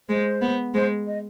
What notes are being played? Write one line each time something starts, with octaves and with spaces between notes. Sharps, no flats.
G#3 C5
B3
G#3 C5
D#5